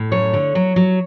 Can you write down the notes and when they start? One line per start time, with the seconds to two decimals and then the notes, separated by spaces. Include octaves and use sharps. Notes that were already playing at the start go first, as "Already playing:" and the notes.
Already playing: A2
0.12 F#2 C#5
0.33 D3
0.55 F#3
0.76 F#3